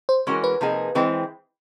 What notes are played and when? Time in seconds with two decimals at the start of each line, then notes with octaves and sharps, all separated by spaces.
0.09 C5
0.27 E3 G#3 C#4 F#4 A#4
0.44 B4
0.61 C3 F3 A#3 D#4 G#4
0.95 E3 G#3 C4